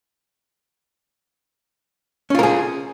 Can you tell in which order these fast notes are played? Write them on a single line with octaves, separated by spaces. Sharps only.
C#4 F4 A#4 G#4